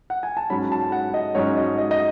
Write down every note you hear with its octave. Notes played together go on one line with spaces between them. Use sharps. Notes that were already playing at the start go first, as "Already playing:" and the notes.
F#5
G#5
A5
G#2 F#3 C#4 B5
A5
F#5
D#5
G#2 F#3 C#4 C#5
D#5
D#5
D#5